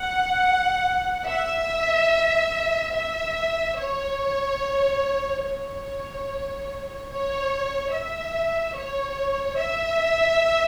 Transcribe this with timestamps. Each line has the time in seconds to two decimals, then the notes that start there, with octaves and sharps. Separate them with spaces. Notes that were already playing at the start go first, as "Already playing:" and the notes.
Already playing: F#5
1.27 E5
2.94 E5
3.77 C#5
5.43 C#5
7.11 C#5
7.93 E5
8.76 C#5
9.60 E5